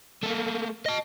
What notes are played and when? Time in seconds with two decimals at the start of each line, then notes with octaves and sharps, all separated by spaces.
0.23 A3 A#3
0.86 D#5 A5